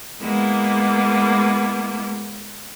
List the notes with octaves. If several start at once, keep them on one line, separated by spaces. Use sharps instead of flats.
G#3 A#3 B3 E4